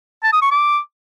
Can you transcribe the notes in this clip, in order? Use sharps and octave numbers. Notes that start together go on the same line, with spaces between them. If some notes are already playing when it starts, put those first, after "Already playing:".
A5
D#6
C#6
D6